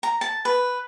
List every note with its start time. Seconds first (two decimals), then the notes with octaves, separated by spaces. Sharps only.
0.03 A#5
0.21 A5
0.45 B4